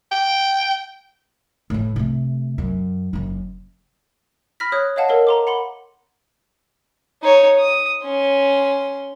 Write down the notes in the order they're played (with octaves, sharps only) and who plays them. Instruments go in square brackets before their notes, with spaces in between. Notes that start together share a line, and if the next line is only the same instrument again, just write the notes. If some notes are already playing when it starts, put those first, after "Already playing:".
[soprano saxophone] G5
[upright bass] A2 E3
C3 A3
F#2
F#1 F#2
[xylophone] B5 F6 A#6 B6
C#5 D#6 F#6 G#6
C#5 D#5 F5 F#5 A5
A4 A#4 C#5 D#5 F5
A#5 C6 D6
F#5 B5 C6
[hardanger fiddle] D#4 C#5
D#6
C#4 C6